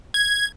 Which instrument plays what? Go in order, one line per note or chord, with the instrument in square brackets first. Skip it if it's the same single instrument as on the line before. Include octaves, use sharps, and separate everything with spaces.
[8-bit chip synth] G#6